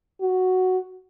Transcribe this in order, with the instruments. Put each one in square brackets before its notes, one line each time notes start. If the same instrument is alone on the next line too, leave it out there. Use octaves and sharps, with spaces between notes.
[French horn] F#4